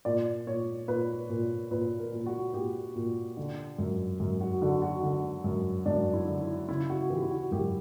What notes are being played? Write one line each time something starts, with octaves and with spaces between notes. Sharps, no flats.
A#2 D5
A#2 C#5
A#2 B4
A#2
A#2 B4
A#4
A#2
F#4
A#2 G4
A#2
D3
F#2
F#2
F#4
D3 F#4
F#4
D3
F#2
F#2 D4
E4
D3
E4
C#3 E4
F#4
E3 G4
E4
F#4
F#2 G4